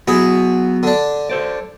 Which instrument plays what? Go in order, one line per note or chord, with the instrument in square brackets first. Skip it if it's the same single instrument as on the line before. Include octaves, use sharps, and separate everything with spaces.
[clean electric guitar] F#3 B3 F#4 [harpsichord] E4 G#4
[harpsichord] D3 D4
[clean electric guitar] A4 C5 D5